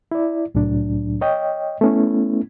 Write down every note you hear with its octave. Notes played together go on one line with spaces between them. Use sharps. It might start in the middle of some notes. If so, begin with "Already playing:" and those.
E4 D5
C2 A2 F#3 D4
C#5 D#5 G5
A3 B3 C#4 E4